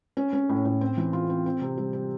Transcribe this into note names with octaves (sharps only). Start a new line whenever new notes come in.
C#4
C#4
A2
A2
C4
E3
F4
C4
C4
C3
G3
C4